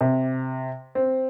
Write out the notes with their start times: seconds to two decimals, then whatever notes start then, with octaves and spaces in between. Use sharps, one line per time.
0.01 C3
0.95 C4